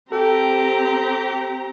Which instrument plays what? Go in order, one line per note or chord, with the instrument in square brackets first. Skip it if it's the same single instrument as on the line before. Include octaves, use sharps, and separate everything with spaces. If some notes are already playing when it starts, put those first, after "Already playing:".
[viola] C4 A#5 [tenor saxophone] G4 [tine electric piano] A4 G5